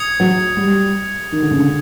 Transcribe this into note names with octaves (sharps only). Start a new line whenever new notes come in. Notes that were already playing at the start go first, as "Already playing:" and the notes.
Already playing: D#6 G#6 C#7
F#3
G3
D#3
D3
C#3
D3